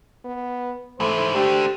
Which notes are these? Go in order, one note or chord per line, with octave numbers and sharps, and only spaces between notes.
B3
G#2 E3 A3 C5
A3 D4 G4